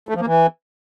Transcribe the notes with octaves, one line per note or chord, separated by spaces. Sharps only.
A3
F3
A#3
E3